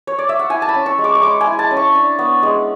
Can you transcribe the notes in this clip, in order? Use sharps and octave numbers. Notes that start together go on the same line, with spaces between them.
C#5
D5
E5
F#5
E4 G#5
A5
B5
C#4
C#6
G#3
D6
C#6
G#3 D6
G#5
E4
A5
C#4
C#6
D4
B3
G#3